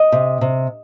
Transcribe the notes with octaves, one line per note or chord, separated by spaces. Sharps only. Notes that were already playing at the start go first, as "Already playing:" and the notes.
Already playing: D#5
C3
C3